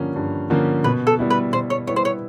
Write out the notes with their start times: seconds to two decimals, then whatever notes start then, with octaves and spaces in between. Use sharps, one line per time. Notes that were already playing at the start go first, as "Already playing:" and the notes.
Already playing: G2 D3 F3 A#3 C#4
0.16 G2
0.50 D3 F3 A#3 C#4
0.84 B2 B4
1.07 A4
1.19 G3 B3 E4
1.30 B4
1.53 B2 C5
1.70 C#5
1.87 G3 B3 E4 C#5
1.96 C5
2.05 C#5